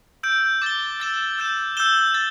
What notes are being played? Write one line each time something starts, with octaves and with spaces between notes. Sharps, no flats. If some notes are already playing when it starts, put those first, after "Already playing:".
E6 G6 D7
D6 A6 G7
E6 A6 E7
E6 G6 E7
E6 G6 E7 G7
A6